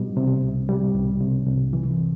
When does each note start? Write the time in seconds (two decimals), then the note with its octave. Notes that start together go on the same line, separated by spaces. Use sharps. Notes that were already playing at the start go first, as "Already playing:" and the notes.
Already playing: B2 G3
0.17 C3
0.43 C2
0.69 G3
0.95 C2
1.21 C3
1.47 C2
1.73 E3